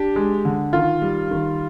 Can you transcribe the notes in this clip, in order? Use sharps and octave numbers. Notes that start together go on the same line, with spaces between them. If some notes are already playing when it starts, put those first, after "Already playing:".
Already playing: D4 G4
G#3
D3
D#3 F4
G3
D#3